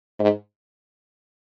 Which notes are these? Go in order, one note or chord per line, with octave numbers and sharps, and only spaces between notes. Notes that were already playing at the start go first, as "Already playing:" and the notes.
G#2